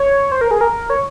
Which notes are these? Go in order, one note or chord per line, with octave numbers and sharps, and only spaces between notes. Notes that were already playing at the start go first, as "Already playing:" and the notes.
Already playing: C#5
C5
A#4
G#4
A#4
C#5